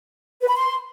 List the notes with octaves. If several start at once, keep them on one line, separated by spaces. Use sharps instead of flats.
B4
B5
C6